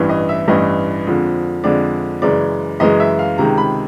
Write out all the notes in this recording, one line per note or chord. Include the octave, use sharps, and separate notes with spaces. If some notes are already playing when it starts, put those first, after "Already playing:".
Already playing: A1 G2 E3
D#5
E5
A1 G2 E3 D#5
F2 D3 F3 G#3
F2 D3 F3 G#3 D5
F#2 C#3 E3 G#3 D5
F#2 C#3 E3 G#3 D#5
E5
F5
C#2 C3 D#3 G#3 A#5
B5